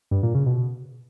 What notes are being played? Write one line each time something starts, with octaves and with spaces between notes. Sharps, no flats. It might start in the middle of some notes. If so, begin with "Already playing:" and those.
G2
A#2
C#3
B2